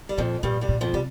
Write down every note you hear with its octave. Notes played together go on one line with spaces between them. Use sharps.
G3
F2 A#2 F3
G2 A#2 G3
G2 G3
A#2
F2 F3
C3 G3